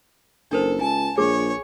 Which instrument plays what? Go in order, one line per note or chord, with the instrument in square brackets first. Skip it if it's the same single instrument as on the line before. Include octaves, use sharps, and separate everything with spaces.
[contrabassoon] F#1 [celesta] D4 A#4 C5 [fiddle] A4
[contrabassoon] C#2 [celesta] G#5 [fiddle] A5
[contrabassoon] A#1 [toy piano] G#4 [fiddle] C#5